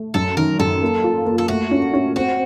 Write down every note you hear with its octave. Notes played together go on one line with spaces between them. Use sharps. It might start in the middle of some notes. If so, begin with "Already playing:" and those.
Already playing: A3
F#2 A4
D#3 A#4
F#2 A4
A#3
F4
A#3
A4
A3 F#4
C#4
C#4
C4 F#4